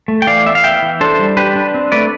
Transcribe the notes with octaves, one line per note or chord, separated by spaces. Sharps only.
A3
G5
E3 D5 F5
B3 E5
F5
B3 E5 G5
E3
D4 A4 C5
G3
D4 G4 B4
D4
C4
A3 B4 D5